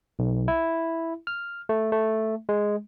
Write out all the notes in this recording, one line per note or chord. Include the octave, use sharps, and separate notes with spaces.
B1
E4
F6
A3
A3
G#3